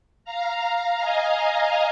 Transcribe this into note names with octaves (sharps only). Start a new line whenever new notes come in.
F5 A#5
D#5 G#5